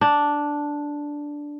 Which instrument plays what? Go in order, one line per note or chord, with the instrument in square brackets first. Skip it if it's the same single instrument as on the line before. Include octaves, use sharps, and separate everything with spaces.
[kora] D4